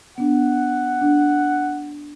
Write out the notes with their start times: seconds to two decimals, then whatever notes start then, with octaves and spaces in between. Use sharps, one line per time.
0.18 B3 D4 F#5
1.02 D4